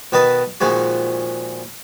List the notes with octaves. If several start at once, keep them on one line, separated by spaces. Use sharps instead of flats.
B2 D#3 B4 D#5 A5
A#2 D#3 F3 G#3 F#4